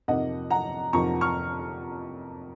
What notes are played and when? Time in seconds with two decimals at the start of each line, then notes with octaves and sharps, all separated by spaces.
0.08 F2 C3 F3 A#3 D#4 D#5 F#5
0.50 F#5 A#5
0.93 F2 C3 F3 A#3 D#4 A#5 C#6
1.21 C#6 F6